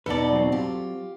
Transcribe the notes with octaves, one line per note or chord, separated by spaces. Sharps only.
E2 B2 D#4 A4 B4 D5
F#3 C4
F4 G4